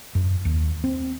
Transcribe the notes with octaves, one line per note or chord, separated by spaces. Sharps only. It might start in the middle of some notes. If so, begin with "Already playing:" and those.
F#2
D#2
C4